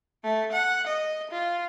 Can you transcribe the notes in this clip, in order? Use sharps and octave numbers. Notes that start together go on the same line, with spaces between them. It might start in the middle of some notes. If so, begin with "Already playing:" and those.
A3
F#5
D#5
F4